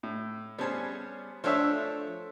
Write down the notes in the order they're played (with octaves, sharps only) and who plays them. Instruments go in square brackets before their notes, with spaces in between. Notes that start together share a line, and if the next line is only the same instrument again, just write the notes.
[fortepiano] A2
[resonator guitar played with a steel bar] G3 C#4 G#4 [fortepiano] B3 C5 A5
[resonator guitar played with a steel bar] F3 A3 D4 [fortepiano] C5 C#5 E5